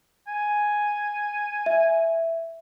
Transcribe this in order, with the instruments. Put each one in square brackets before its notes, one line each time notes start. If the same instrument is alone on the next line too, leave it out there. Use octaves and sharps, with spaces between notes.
[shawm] G#5
[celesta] E5